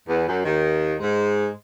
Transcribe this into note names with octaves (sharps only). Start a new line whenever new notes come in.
E2
F#2
D#2 D#3
G#2 G#3